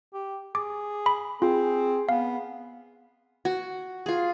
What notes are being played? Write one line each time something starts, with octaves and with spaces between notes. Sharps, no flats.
G4
G#4 D6
B5
C4 F4 G#4
B3 F5
F#4
F4 G#4